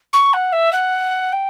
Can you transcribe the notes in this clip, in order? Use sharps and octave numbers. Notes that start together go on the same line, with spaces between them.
C#6
F#5
E5
F#5
G5